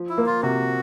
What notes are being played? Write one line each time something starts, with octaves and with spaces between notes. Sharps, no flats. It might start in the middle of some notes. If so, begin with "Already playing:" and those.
Already playing: F3
E4
A#3
F4
C3 F#4